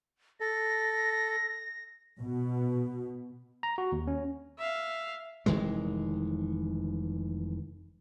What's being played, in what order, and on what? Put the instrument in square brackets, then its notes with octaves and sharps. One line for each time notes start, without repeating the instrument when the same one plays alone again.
[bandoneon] A4 [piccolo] A#6
[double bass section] B2
[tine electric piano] A#5
F#4
D#2
C#4
[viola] E5 F5
[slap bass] F1 D#3 E3 G#3